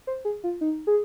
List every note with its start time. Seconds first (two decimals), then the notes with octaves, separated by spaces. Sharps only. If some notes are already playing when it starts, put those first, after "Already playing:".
0.07 C5
0.25 G#4
0.44 F4
0.61 D#4
0.87 G#4